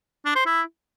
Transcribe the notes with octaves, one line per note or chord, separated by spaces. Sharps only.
D4
C5
E4